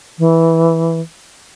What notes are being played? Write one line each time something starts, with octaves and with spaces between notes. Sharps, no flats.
E3